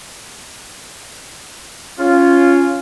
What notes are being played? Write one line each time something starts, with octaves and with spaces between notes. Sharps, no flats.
C#4 F4